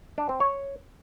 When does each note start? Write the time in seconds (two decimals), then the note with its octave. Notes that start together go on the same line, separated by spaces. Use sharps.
0.18 D4
0.29 C4
0.40 C#5